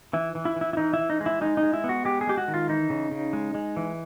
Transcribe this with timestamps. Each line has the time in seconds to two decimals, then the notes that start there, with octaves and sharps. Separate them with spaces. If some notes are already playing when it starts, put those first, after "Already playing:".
0.13 E3 E4
0.35 E3
0.45 E4
0.56 E3
0.61 E4
0.73 E4
0.77 E3 D#4
0.94 E4
0.99 E3
1.10 D#4
1.21 G#3
1.26 E4
1.41 G#3 D#4
1.57 D#4
1.63 G#3
1.73 E4
1.84 B3
1.89 F#4
2.05 G#3 G4
2.21 G#4
2.27 G#3 G4
2.37 F#4
2.48 D#3
2.54 F4
2.69 E3 D#4
2.90 C#3
3.11 C#3
3.33 G#3
3.55 G#3
3.77 E3